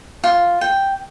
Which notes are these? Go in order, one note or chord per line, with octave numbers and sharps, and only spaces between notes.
F4
G5